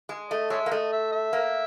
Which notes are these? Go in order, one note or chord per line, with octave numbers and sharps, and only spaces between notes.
G#3
A3 D#5
G#3 C#5 E5
A#3
A3 D#5
E5
E5
A#3